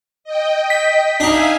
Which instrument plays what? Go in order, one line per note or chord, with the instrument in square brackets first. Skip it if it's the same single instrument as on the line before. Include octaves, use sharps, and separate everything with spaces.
[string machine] D#5 G5
[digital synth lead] B6
[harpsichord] D4 D#4 [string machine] E5 F5 G#5